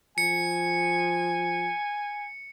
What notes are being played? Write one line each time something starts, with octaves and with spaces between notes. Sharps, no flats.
F3 G#5 C#7